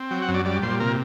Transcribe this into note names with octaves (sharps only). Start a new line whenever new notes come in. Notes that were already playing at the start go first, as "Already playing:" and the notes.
Already playing: C4
F#3 G5
F#5
F#2
D5
G3 D5
A#2 C5
C3 A#4